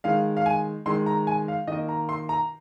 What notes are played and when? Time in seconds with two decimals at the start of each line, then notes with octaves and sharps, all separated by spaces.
0.04 D#3 G#3 F5
0.37 F5
0.46 G#5
0.86 D#3 G#3 C6
1.06 A#5
1.27 G#5
1.48 F5
1.67 D#3 A#3 D#5
1.89 A#5
2.09 C6
2.29 A#5